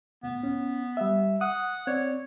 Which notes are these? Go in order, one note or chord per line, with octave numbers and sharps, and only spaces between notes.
C#2 A2 B3
C#4
G3 E5
F#5 D#6
C4 C#5 D5